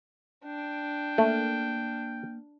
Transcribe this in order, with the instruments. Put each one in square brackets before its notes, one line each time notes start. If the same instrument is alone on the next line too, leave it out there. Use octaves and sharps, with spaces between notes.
[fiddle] D4 [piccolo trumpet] G5
[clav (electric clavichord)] A3 [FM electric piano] A#3